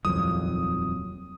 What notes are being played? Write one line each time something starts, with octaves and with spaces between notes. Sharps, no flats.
D#1 C2 F2 F#3 D#6